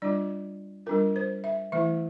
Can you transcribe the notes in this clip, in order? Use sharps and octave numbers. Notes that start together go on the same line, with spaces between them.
G3 D4 F4 D5
G3 D4 F4 A#4
C5
E5
E3 A3 E4 E5